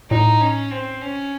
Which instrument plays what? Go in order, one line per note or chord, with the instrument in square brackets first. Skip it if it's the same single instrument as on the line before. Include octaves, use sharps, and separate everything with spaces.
[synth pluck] A2 [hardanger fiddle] D#4
[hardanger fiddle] C#4
C4
C#4